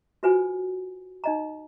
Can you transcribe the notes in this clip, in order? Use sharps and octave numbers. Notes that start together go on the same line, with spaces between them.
F4 F#4 B4 C5 G#5
D#4 D#5 A#5